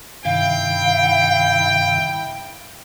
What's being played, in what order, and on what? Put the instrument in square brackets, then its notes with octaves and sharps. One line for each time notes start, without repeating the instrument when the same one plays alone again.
[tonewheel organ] G2 C3 D#3 [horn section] E4 G5 [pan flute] F5